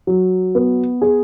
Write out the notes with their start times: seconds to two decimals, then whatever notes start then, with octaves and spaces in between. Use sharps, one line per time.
0.07 F#3
0.55 B3
1.02 G#4